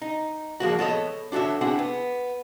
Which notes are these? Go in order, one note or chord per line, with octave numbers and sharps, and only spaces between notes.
D#4
F3 G#3 A#3 F#4
B3 A4 C#5 D#5
D4 F#4 A4 C#5 E5
C4 D4 E4 F#4 G#4 F#5
B3